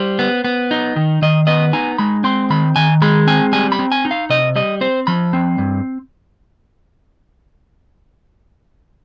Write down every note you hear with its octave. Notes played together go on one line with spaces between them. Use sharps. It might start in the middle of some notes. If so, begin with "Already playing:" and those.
Already playing: G3 C5
B3
B3
D#4
D#3
D#3 D#5
B3 D#5
D#4 G#5
G#3 B5
C4 C6
D#3 B5
D#3 G#5
G#3 B5
C4 G#5
G3 G#5
B5
C4
G#5
D#4
F5
C3 D#5
G3 D#5
C4 C5
F3 B5
C4
G2